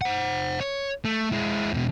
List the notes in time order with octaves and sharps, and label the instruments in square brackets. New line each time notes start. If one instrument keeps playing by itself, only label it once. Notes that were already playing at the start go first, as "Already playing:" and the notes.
[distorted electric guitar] C5 F#5
C#5
A3
G#3 E4
E2 B2